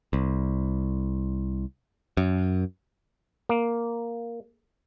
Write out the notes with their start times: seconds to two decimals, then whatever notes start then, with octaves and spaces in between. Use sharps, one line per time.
0.13 C2
2.17 F#2
3.49 A#3